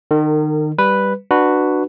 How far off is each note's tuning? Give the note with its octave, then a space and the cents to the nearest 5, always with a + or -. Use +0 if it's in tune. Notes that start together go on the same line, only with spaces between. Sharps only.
D#3 -30 A#4 -45
G3 +0 B4 +0
D4 +20 F#4 +0 B4 +0